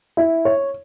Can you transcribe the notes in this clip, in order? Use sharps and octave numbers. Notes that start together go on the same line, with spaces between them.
E4
C#5